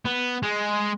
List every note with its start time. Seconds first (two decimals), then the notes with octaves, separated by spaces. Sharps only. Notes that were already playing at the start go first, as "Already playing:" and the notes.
0.05 B3
0.43 G#3